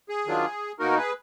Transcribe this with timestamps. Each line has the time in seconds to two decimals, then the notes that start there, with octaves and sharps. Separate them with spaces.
0.09 G#4
0.26 D#3 F#3 D4 F4
0.79 B2 A#3 D#4 F#4 A#4
0.97 G#4 B4